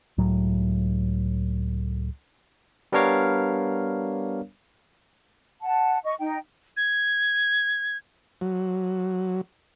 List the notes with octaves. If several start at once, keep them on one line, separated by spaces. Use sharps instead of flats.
C#2 A2 F#3
G3 B3 D4 A#4 C#5 F5
F#5 A5
D#5 C#6
D#4 G5
G#6
F#3